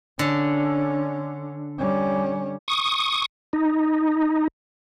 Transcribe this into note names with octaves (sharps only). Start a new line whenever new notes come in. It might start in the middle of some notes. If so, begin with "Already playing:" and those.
D3 C#4
G3 C#4
C#6 D#6
D#4